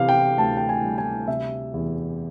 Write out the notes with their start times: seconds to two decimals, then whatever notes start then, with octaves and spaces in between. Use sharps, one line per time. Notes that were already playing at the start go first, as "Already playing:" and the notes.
Already playing: C3 E3 F5
0.09 G5
0.38 D2 A5
0.57 G5
0.69 G#5
0.83 G3
0.98 G#5
1.28 C3 E5
1.74 E2